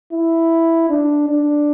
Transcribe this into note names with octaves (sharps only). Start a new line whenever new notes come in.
E4
D4
D4